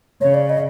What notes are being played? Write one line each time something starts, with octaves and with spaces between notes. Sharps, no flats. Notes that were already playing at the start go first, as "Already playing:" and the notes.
C#3 C#5
D5
D#5